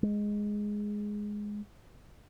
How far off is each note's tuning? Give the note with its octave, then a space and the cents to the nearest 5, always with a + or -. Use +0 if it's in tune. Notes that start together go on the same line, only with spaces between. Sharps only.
G#3 +0